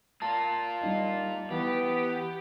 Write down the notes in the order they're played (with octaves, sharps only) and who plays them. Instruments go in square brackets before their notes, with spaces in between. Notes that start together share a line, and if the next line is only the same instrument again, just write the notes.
[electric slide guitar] A#3 F4 [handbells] A5
[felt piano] G3 D#4 D#5
[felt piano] E3 [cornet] B3 [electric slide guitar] G4